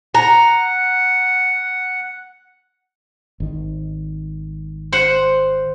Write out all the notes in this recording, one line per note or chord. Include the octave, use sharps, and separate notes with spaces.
F#5 A#5
G#1 D#3
C5 F#5